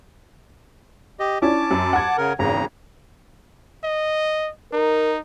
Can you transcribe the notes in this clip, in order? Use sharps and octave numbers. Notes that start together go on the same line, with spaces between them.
G4 D#5
C#4 D4 E4 A5 D6
F#2
F#5 G#6
C#3 A#4
G#1 E2 C#3 A#5
D#5
D#4 A#4